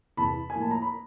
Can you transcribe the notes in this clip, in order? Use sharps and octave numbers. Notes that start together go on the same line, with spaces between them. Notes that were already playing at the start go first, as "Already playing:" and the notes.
E2 C3 E3 A5 B5
G#5
A2 F3 A#3
A5
A#5
B5